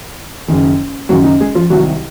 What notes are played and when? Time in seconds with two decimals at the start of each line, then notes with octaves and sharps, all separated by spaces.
0.48 F#1 F#2 D#3
1.09 F#1 F#2 D#3 F#3 F#4
1.24 D#4
1.40 G#3 G#4
1.55 F3 F4
1.70 C2 C3 D#3 F#3 F#4